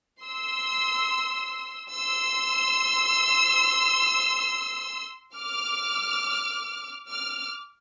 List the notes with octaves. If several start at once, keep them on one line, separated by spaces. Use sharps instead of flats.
C6 E6
C6 E6
D6 F6
D6 F6